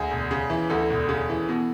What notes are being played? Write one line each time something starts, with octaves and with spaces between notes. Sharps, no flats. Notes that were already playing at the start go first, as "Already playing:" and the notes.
Already playing: D2 G#4
E1
C#3
E3
D2 A4
E1
C#3
E3
B2